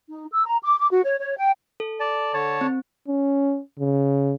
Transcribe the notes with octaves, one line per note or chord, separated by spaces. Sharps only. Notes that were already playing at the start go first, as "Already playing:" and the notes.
D#4
E6
A#5
D6
D6
F#4
C#5
C#5
G5
A4
D5 A5
D3 C#5 A5
C4
C#4
C#3